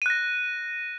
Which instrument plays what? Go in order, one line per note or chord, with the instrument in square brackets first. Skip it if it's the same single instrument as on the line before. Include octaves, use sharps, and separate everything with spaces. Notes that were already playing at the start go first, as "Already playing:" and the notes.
[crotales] D#7
F#6
A#6